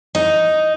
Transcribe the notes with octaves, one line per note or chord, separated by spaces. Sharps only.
D#4